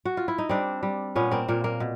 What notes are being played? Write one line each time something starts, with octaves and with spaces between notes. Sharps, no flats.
F#4
F4
E4
D#4
G3 C4 D4
G3
A#2 B3 C#4
A#3 C4
A#2 A#3
A#3
B2